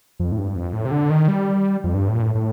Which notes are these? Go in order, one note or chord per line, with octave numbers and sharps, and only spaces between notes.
F2
A2
G2
F2
A2
C3
D3
D#3
G3
F2
G2
A2
A#2
A2
A2